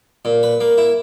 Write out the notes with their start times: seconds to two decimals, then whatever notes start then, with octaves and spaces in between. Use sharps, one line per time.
0.25 A#2
0.43 B4
0.60 A#3
0.78 E4